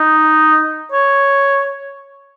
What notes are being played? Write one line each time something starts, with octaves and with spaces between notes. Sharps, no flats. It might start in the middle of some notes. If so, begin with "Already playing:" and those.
Already playing: D#4
C#5